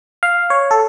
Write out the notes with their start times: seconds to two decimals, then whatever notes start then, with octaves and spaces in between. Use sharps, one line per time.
0.23 F5
0.50 C#5
0.71 A4